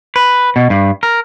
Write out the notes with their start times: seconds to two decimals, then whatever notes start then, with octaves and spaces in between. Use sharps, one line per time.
0.16 B4
0.56 B2
0.70 G2
1.03 A#4